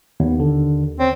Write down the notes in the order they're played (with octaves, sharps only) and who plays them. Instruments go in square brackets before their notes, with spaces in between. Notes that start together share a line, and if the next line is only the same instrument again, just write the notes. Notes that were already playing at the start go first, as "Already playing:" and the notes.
[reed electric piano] D#2 [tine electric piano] B3
[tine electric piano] D3
[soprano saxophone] C4 [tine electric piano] C#5